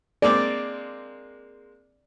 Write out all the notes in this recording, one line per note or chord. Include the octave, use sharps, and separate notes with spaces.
G#3 A#3 C4 D5